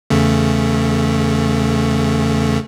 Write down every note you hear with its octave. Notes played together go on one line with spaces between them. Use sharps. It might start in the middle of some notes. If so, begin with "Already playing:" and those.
E2 C#3 A3